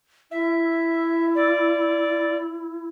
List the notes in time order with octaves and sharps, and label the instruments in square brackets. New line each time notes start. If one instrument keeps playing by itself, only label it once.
[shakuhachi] E4 [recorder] E5
[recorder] D5